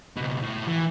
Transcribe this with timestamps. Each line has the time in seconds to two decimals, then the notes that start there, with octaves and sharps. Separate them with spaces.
0.16 C#2 B2
0.43 A2
0.67 E3